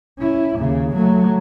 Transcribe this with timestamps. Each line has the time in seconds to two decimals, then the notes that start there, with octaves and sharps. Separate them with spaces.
0.19 C#4 E4
0.57 D#2 C#3
0.93 F#3 A3